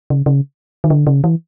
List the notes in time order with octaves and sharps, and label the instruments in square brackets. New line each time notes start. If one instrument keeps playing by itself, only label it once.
[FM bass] C#3
C#3
D#3
D3
C#3
E3